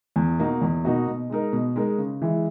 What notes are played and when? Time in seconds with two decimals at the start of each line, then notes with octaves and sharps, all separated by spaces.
0.16 E2
0.40 B2 A#3 D#4 F#4
0.61 E2
0.85 B2 A#3 D#4 F#4
1.08 B2
1.30 G#3 D#4 A#4
1.53 B2
1.76 G#3 D#4 A#4
1.98 C#3
2.22 E3 G#3